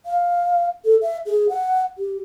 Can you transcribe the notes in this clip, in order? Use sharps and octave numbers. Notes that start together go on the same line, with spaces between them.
F5
A4
E5
G#4
F#5
G4